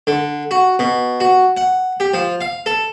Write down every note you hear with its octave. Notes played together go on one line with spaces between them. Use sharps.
D3
F#4
B2
F#4
F#5
G4
F3
F5
A4